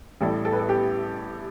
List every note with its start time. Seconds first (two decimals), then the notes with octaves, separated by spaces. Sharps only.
0.21 A1 A2 G3 A4
0.45 A4
0.52 B4
0.60 A4
0.69 G4